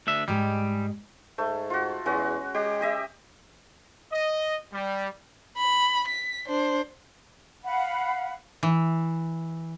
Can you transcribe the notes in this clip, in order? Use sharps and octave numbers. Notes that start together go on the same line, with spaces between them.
D2 D4 E5
G#2 G3 G#3 G4
G#2 A3
F4 F#4
E2 G#3 C#4 F#4
G#3 G4
G4 D#5 E5
D#5
G3
B5
B6
D4 C5
F5 F#5 B5
E3